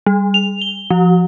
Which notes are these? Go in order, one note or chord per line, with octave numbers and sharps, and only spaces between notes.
G3
F7
G7
F3